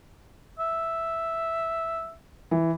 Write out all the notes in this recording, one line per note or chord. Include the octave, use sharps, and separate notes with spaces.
E5
E3